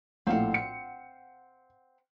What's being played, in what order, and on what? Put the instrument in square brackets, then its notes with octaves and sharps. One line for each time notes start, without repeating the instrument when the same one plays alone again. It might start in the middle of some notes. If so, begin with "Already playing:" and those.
[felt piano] A#1 A2 [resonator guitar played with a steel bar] C4 F5 F#5
[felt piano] C#7